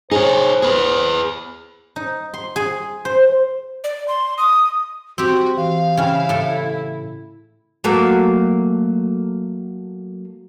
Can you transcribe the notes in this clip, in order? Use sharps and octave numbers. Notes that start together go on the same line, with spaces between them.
D#4 G#4 C5 C#5
B3 G#4 B4
D#4
C6
G#4
C5
D5
C6
D#6
C4 F#4 G4 E6
E3 F5
C#3 C#4 E4 G5 F6
A2 A4
F#3 A3 A#3